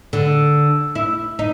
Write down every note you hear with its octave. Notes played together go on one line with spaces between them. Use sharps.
D3
E4
D#4